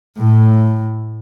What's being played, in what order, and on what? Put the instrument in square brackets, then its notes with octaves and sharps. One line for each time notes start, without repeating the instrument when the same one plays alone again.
[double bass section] A2